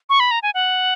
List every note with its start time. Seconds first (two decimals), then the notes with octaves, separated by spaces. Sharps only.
0.10 C#6
0.20 B5
0.31 A#5
0.43 G#5
0.54 F#5